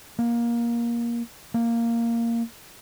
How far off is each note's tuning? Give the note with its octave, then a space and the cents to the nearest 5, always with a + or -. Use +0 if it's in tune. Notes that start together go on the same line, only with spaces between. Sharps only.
A#3 +15
A#3 -5